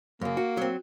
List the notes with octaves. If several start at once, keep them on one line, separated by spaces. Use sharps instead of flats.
F#2 C#3 A#3
F#4
F#3 C4